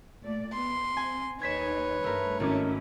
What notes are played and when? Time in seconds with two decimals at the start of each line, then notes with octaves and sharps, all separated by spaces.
0.22 A#2 A3 D5
0.53 B3 C6
0.97 C4 G#5
1.41 D#2 D#4 B4 C#5 G#6 B6 E7
2.04 G2 A3 A#4
2.40 G#1 C4 C#4 E4 A#4 D6